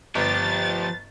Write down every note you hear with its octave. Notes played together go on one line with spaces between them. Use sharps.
G1 F3 G4 A6